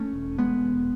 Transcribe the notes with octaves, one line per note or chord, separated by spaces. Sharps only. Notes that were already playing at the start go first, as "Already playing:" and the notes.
Already playing: A3 C#4
E1
E1 G#3 B3
E1